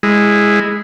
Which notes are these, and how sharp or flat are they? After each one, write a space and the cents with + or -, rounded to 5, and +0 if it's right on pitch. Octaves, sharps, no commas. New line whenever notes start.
G#3 -10 E4 +0